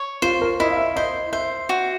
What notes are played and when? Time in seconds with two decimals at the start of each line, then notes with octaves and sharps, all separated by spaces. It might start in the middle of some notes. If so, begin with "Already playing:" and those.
Already playing: C#5
0.22 F4 C5
0.42 A#4
0.60 E4 D#5
0.71 F5
0.77 E5
0.96 C5 D#5
1.32 C5 E5
1.69 F#4